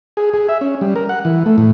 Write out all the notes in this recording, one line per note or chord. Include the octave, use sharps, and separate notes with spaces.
G#4
G#4
E5
C#4
G3
A#4
F#5
E3
A3
A2